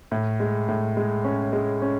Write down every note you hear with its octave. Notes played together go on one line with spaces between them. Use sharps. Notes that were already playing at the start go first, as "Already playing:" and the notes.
A2
G#3
A2
G#3
C#4
G#3
C#4